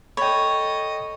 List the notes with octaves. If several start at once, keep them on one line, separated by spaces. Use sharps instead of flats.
A4 C#5 D#5 G5 B5